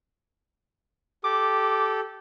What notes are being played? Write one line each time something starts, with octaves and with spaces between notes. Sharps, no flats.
G4 A4 D6